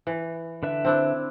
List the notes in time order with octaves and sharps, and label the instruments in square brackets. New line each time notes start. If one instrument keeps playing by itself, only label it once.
[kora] E3
[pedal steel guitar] D3 B4 E5
[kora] C4 D4 E4